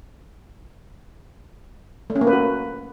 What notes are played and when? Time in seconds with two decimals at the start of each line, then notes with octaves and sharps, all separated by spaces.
2.10 A3
2.16 C#4
2.21 A#3
2.27 B4
2.33 F#4